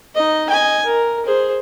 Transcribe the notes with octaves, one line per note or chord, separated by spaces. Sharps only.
D#4 D#5
D#5 G#5
A#4
G#4 C5